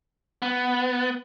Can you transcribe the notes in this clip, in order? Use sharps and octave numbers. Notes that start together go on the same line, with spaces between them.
B3